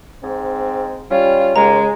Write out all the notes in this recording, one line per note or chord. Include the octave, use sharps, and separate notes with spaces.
G#2 C4
G3 C#4 F4
D#2 C#3 G#3 A#5